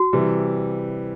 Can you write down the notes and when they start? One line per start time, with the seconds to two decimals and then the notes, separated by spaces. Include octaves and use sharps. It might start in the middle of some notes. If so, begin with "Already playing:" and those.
Already playing: F#4
0.13 C3 E3 G3